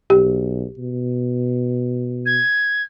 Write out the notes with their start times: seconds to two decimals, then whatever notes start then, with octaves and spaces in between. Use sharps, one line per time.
0.10 B1 G4
0.78 B2
2.26 G#6